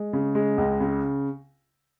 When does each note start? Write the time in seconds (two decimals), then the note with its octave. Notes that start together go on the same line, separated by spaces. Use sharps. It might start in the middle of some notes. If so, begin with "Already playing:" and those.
Already playing: G#3
0.13 C#3
0.35 G#3
0.58 C#2
0.80 C#3